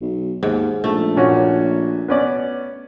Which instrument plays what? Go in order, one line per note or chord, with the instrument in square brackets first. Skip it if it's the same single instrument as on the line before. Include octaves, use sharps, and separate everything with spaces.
[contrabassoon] B1
[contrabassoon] D#2 [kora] G#2
[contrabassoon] A#1 [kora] A3
[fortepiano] A#2 C#4 F#4
B3 C#4 D5